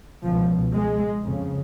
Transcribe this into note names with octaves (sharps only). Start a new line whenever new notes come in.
C#2 B2 F3
G#3
F2 C#3